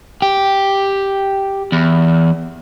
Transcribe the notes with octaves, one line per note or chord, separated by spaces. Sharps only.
G4
E2